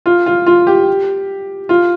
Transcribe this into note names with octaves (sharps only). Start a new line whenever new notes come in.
F4
F4
F4
G4
F4